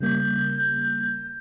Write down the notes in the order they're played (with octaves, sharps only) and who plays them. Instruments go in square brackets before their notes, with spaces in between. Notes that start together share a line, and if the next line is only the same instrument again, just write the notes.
[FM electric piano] C#3 G3 A#3 [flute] G6